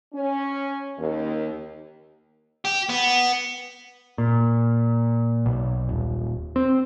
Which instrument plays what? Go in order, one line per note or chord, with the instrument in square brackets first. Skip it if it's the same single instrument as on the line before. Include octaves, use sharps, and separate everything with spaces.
[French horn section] C#4
D#2
[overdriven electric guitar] G4
B3
[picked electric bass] A#2
B1
D#1
C4